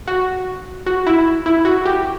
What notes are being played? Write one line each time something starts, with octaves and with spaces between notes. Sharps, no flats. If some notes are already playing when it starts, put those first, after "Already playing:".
F#4
F#4
E4
E4
F#4
G4